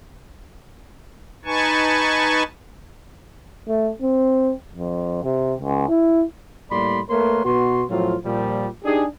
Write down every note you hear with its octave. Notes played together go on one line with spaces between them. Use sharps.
D#4 B4 G#5 A5 C#6
A3
C4
F2
C3
C#2
E4
A2 G3 A#3 D5 B5 C6
A3 A#3 A#4 B4 C#5 C6
B2 B3 F#4 C6
A2 F3 F#3 C4 F4
A#2 F3 G3
D4 D#4 G4 G#4